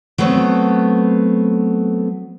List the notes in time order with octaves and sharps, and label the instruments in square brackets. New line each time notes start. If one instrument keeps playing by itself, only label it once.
[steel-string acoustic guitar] F#3 A3 B3 C4